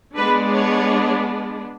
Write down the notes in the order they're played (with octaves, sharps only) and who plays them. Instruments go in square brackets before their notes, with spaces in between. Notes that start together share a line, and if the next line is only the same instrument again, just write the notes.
[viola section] G#3 B3 D4 B4
C#5